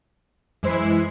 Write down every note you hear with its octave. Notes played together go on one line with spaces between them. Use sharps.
F#2 E3 G#3 E4 C5 C7